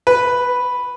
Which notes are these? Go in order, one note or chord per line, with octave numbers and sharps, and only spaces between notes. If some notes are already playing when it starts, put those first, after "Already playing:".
B4